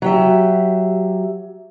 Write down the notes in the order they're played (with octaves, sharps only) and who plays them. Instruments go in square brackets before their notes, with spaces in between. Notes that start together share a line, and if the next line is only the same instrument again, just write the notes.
[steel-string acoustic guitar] F#3 G4 E5